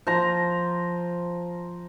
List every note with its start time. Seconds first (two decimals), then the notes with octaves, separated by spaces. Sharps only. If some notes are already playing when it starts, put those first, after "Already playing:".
0.07 F3 A#5